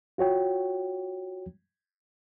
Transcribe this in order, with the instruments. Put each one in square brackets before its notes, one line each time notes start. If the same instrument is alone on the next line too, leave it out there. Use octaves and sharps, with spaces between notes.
[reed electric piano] F4 F#4 C#5 G5